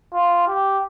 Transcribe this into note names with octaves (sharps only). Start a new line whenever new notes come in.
F4
G4